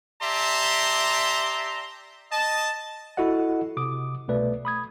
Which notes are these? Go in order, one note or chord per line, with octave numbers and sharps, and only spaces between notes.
G4 D5 E5 A5 A#5 C6
D#5 A5
E4 F#4 A4 D#5 F#5
C3 D6 D#6
C2 B2 A3 B4 D5
B5 D#6 G#6